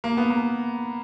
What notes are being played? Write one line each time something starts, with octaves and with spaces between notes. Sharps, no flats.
A#3
B3
A#3